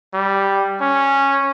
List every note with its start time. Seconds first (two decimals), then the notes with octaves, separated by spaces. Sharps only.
0.14 G3
0.81 C#4